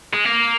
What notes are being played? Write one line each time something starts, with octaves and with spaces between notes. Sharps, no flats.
G#3
A#3